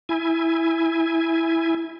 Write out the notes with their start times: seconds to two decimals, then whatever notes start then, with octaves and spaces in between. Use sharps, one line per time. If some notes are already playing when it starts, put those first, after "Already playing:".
0.09 E4 G#5